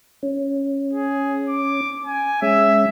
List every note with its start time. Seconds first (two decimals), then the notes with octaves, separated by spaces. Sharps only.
0.23 C#4
0.93 G#4
1.49 D6
2.05 G#5
2.42 G#3 C#4 E5